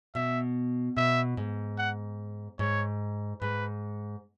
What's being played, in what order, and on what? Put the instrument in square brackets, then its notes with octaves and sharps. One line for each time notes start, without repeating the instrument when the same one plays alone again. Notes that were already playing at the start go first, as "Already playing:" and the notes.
[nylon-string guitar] B2 [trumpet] E5
[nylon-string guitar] B2 [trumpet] E5
[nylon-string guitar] G#2
[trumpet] F#5
[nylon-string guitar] G#2 [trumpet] C#5
[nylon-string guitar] G#2 [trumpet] B4